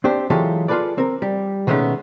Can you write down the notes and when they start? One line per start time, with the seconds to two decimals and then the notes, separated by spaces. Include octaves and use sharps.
0.04 C4 D4 G4 C5
0.30 E3 F#3 G#3 F4 G4 A4
0.68 F4 G#4 A4 B4 D5
0.98 C4 A#4
1.22 G3
1.67 B2 D#3 G#3 A3 B3 C#4